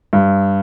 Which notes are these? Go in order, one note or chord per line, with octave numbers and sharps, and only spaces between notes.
G2